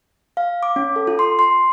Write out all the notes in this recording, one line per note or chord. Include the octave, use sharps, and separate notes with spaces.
F5
D6
C#4
A4
F4
C6
C6